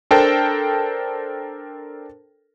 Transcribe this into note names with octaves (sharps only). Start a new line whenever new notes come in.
D4 A4 A#4 C5 G5 A5